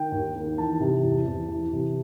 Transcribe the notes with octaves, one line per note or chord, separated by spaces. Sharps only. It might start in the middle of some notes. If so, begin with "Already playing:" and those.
Already playing: D#3 G5
D#2
D#3
E3 A5
C3
E2
E2
E3
C3